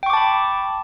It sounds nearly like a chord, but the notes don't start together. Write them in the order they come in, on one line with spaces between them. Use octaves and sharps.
G5 C#6 D6 A5 B5